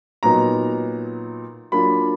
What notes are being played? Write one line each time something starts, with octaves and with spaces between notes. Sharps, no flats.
A#2 F#3 B3 D#4 A#5
F#3 A#3 D4 F4 B5